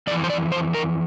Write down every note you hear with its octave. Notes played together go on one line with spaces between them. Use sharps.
F2 E3 D5
C5
D5
C5
A#4